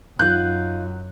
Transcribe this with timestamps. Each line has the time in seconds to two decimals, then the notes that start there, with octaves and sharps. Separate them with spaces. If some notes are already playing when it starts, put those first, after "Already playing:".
0.19 F#2 D#4 F4 F#6 G6